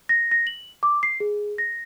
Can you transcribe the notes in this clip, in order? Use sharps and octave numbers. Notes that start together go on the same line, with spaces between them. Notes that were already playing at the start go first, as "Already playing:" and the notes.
A#6
A#6
F#7
D6
C7
G#4
A#6